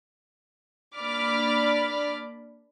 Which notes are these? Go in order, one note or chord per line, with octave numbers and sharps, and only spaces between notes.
A#3 D4 D5 B5 D6 F6